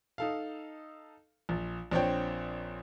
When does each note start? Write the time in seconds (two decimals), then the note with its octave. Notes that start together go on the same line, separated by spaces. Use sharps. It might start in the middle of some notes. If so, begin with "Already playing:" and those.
0.18 D#4 A4 F5
1.49 A#1
1.91 A#1 C4 D4 C#5 G5